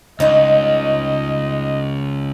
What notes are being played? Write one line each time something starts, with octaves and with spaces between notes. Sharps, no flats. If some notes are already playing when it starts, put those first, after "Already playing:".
C#2 G2 D#4 D#5